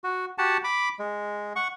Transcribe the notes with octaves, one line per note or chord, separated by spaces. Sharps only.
F#4
F#4 G4 F#5 A5
B5 D6
G#3
F#5 C#6